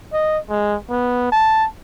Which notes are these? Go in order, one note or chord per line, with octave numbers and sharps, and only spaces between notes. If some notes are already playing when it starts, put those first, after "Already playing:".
D#5
G#3
B3
A5